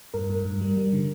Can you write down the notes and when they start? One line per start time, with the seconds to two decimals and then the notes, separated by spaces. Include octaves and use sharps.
0.14 G2 A#4
0.30 G2
0.45 G2
0.61 G3
0.77 G3
0.93 D3